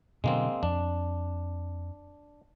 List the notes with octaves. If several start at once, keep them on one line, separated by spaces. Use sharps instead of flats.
B2 D3 F#3 G#3 A#3 C4
F2 D4